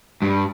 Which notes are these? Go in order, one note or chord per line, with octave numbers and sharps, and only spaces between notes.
G2